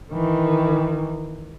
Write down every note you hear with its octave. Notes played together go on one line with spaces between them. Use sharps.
D#3 E3